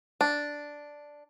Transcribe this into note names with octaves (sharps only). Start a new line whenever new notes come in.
D4